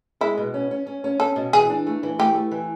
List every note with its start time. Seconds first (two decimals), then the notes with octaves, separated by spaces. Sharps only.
0.21 G#3 E4
0.37 B2
0.54 C#4
0.71 C#4
0.87 C#4
1.04 C#4
1.20 C#4 A4
1.36 B2
1.53 E3 G#4
1.70 D4
1.87 A3
2.03 E3
2.19 A3 G4
2.35 A3
2.51 E3